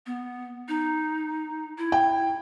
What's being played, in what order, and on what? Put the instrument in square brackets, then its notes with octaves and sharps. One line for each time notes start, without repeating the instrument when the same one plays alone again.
[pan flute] B3
D#4
E4
[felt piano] G5